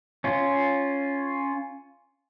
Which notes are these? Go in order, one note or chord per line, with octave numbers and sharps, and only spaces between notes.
C#4 F4